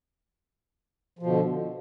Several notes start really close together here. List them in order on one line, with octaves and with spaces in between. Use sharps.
F3 B2 D3